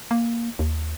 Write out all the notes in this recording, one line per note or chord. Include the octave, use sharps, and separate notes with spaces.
A#3
D#2